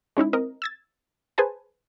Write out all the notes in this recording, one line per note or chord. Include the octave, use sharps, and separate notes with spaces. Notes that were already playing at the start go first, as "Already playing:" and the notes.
G#3 C#4 D#4 E4
C4 A#4 D#5
E6 G#6 A6
G#4 B4 C5 G#5 A5